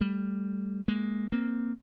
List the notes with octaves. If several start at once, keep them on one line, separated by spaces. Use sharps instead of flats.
G3 A3
G#3 A#3
A#3 C4